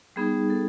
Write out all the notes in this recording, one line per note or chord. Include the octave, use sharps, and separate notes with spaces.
G3 B3 D#4 G#4
A4